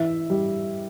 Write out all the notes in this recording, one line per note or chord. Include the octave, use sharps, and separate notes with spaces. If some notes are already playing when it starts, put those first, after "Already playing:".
Already playing: E3 E5
G3